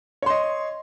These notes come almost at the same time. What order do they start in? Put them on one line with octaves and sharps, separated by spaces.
C#5 C6 D#5